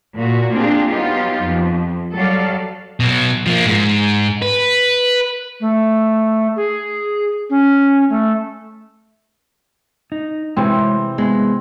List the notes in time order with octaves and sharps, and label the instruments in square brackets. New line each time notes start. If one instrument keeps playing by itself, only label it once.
[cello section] A#2 F#4
A#3 C4 D4 F4 G4 G#4
F#3 B3 D#4 F4 G4
F2
F#3 G3 A4 D5 F5
[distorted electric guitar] B2 F#3
F3 A#3
G#2
B4
[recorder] A3
G#4
C#4
A3
[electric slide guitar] D#4
[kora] C3 E3 [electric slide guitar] G#3 C#5 [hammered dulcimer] C4
[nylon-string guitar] G#3 [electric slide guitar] B3